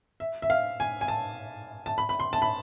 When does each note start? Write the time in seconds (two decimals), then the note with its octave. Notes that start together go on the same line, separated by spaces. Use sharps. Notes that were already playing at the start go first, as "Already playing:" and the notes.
0.20 E5
0.42 E5
0.50 F5
0.80 G#5
1.01 G#5
1.08 A5
1.86 A5
1.98 B5
2.09 B5
2.20 C6
2.33 A5
2.42 B5